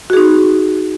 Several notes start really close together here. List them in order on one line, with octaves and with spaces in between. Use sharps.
F#4 G#4 D#4